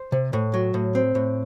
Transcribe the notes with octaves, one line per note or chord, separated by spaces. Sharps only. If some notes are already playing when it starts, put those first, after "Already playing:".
Already playing: C5
C3
A2
F#3
A2
C4
A2